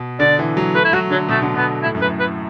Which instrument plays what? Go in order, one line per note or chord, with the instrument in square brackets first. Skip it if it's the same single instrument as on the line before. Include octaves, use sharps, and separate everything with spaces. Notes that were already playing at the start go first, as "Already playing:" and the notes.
Already playing: [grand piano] B2
[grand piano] D3 [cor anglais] D5
[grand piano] E3
F#3
[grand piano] A3 [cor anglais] B4
[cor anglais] E4
[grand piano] F#3 [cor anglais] F#4
[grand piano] D3 [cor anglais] F#3
[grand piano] B2 [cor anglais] A3
[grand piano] D3
[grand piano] B2 [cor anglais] B3
[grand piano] A2 [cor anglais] E4
[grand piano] F#2
[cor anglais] B4
[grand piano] A2
[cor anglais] B4